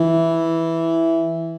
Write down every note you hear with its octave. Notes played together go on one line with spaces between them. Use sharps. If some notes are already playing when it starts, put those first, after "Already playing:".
Already playing: E3